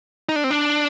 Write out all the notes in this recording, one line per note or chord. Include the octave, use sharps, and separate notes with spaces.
D#4
D4
C4
D4